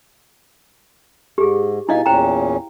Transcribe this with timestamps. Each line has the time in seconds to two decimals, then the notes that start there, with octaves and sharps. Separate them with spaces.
1.38 G#2 G4 G#4
1.89 B2 D#4 E4 D#5 F5 G#5
2.06 E2 A#2 C#4 C5 G5 A#5